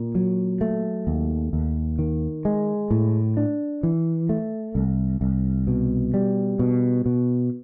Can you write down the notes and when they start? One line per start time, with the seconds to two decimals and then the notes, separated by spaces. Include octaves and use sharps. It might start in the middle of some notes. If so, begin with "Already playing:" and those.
Already playing: A#2
0.15 F#3
0.61 A3
1.07 D#2
1.53 D#2
1.99 D#3
2.45 G#3
2.91 A2
3.37 D4
3.83 E3
4.29 A3
4.75 C2
5.21 C2
5.67 B2
6.14 G3
6.59 B2
7.06 B2